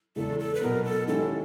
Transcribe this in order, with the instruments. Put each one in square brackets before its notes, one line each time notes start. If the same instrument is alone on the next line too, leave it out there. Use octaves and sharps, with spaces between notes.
[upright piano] E2 C#3 E3 G#3 C#4 [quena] A4
[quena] A4
B4
[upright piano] B2 F#3 B3 [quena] A#4
[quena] A4
[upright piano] D#3 G#3 C#4 E4 G4 [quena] A4